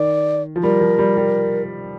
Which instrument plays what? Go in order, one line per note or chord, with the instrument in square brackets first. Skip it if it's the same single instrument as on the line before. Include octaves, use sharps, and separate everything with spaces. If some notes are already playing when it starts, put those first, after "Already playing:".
Already playing: [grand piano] D#3 [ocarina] D5
[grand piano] F3
[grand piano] G3 [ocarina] A#4
[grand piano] F3
G3
G3